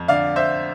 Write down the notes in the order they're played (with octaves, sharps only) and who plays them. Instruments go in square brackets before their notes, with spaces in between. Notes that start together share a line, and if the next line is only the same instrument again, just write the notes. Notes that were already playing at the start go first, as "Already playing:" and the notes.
Already playing: [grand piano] F2
D3 D5 F5
C5 E5